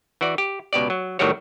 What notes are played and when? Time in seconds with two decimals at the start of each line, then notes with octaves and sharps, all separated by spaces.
0.21 E3 F#4 D5
0.38 G4
0.73 C#2 B2 G4 D5
0.90 F#3
1.19 A2 D#3 F#3 G3 F#4 C#5